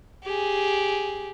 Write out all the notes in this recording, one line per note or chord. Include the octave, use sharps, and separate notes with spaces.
G4 G#4